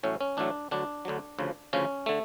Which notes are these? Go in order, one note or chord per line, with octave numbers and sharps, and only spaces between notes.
A1 A2 F#3 A3 C#4
C#4
A1 A2 F#3 A3 D4
D2 D3 F#3 D4
D2 D3 F#3
D2 C#3 F3
D2 C#3 F3 C#4
D3 A3